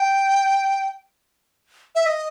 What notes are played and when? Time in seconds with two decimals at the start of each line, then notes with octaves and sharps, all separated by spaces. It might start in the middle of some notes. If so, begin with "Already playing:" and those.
Already playing: G5
1.95 E5
2.06 D#5